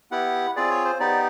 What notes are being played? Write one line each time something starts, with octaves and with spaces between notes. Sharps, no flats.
B3 E4 G4 F#5
C4 F4 G#4 D5
C#5
C5
B3 D#4 G4 D5